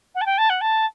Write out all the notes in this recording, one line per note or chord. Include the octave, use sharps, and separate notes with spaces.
F#5
A5
G5
A5
F#5
A5